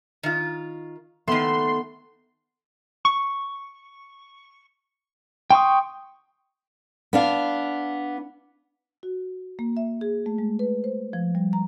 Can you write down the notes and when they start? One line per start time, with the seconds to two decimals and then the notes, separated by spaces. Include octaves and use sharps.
0.23 D#3 F4
1.27 D#3 A3 B3 C6
3.05 C#6
5.51 G5 C6 C#6 D#6
7.13 B3 D4 F5
9.03 F#4
9.59 A#3
9.77 E5
10.01 G#4
10.26 A3
10.38 G#3
10.59 B4
10.84 C5
11.13 F3
11.35 G3
11.53 A#5